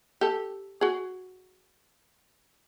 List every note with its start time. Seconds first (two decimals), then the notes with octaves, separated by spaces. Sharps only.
0.21 G4 A4
0.81 F#4 G#4